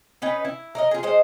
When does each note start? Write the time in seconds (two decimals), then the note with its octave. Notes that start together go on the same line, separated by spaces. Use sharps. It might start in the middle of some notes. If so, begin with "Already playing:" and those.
0.22 C#4 D#4 B4
0.45 E4
0.75 A#4 D5 D#5
0.91 F4 G#4
1.03 G#3 C5 D#5